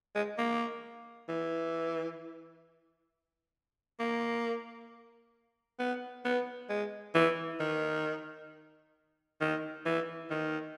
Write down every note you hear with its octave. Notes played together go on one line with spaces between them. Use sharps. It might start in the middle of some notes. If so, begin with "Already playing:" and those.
G#3
A#3
E3
A#3
B3
B3
G#3
E3
D#3
D#3
E3
D#3